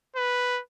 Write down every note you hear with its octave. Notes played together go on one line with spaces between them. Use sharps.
B4